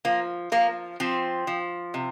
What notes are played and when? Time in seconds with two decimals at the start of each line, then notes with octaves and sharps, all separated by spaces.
0.05 F3 A#3
0.52 F3 A#3
1.00 F3 C4
1.47 F3
1.94 C3